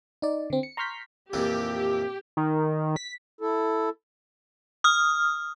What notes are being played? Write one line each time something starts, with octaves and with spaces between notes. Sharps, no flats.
D#4 D5
D3 C4
C#7
A#5 C6 C#6 F6 G6 B6
F2 A#2 E3 G4
D#3
B6
E4 A4
D#6 F6